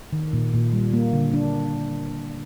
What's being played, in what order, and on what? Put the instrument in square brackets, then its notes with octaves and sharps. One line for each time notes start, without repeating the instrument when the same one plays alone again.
[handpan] D#3
A#2
A#2
G3
A#3
D3
D4